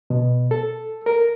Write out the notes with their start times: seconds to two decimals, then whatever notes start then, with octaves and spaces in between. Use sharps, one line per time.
0.10 B2
0.51 A4
1.06 A#4